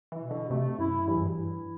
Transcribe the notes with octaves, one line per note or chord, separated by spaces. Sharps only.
E3
B2
D3
C3 A3
F#2 E4
G2 E3
F#2
G2
E4